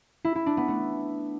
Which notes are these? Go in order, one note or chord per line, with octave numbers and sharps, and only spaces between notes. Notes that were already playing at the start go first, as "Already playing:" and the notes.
E4
E4
D4
B3
A3